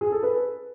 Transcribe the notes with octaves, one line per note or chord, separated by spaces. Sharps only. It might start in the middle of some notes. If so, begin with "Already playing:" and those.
G#4
A4
B4